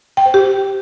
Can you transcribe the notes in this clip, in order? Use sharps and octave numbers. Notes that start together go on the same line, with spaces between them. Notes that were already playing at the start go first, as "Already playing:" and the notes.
G5
C5
G4